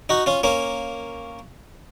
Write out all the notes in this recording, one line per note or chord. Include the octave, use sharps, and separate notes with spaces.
D#4 F#4
C#4 F4
A#3 C#4